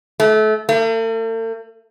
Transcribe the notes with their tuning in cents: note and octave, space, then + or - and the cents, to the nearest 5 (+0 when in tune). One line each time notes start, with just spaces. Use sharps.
A3 -30
A3 +45